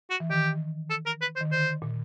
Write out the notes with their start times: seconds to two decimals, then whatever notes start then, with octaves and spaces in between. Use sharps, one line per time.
0.10 F#4
0.20 E3
0.30 D#3 G4
0.90 A4
1.06 A#4
1.21 B4
1.36 C5
1.41 D#3
1.51 D3 C5
1.82 A#2